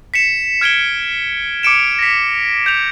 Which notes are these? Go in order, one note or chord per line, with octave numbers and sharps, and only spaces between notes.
B6 C#7 E7
F6 G#6 D7 E7 G7
D6 C#7 D7 E7
A#6 B6
G6 F7